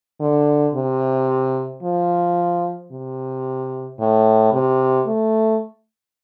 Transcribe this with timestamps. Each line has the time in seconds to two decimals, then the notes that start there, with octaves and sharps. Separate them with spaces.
0.20 D3
0.74 C3
1.83 F3
2.91 C3
3.99 A2
4.53 C3
5.07 A3